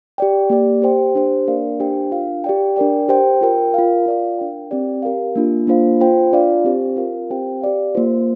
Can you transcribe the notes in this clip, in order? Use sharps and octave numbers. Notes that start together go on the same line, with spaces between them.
G4 D5 G5
A#3 G4 D5
G4 C5 G5
D4 G4 C5
A#3 D4 A#4 D5 F5
D4 G4 C5 G5
D4 F4 A#4 F5
G4 D5 G5
D4 A#4 D5 G5
G4 C5 G5
F4 A#4 G5
F4 A#4 F5
F4 D5 F5
D4 A#4 G5
C4 G4 D5 G5
G4 A#4 F5
A#3 D4 F4
A#3 D4 F4 C5 F5
F4 C5 G5
D4 F4 D5 F5
C4 G4 C5
F4 A#4 F5
C4 G4 C5 G5
G4 D5 F5
A#3 F4 C5